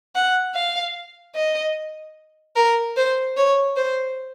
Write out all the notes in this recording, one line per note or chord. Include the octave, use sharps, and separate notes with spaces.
F#5
F5
D#5
A#4
C5
C#5
C5